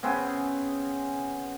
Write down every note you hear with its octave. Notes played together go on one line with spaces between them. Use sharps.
C#3 B3 C4 G#4